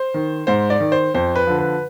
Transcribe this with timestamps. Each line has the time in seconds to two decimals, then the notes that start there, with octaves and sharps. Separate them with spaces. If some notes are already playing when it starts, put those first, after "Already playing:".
Already playing: C5
0.14 D#3
0.47 G#2 C5
0.70 D5
0.80 D#3
0.92 C5
1.14 F2 C5
1.36 B4
1.47 D3 F3
1.58 B4